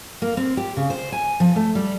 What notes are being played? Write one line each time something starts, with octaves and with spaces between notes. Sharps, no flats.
A#3
C4
G4
C#3
C5
G#5
F3
A3
G3